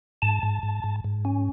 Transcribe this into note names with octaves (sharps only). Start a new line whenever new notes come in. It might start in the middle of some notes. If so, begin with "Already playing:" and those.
G#2 A5
G#2
G#2
G#2
G#2
C#4